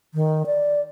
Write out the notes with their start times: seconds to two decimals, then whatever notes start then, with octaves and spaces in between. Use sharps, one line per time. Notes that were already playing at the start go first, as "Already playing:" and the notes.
0.14 D#3
0.46 D5